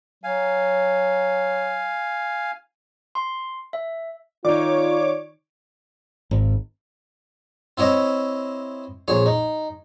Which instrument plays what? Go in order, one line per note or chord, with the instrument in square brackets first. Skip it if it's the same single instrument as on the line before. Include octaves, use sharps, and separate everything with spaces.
[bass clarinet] F#3 [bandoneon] F5 G#5
[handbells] C6
E5
[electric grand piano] D#3 D#4 [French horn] F4 [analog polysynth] C#5 D6 [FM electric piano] D5
[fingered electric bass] G#1
[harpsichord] C4 E4 C#5 D#5 E5
A#1 G#4 C#5
D#4